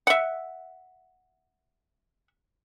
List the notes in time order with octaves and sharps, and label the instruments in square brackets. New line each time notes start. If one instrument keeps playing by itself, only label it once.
[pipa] E5 F#5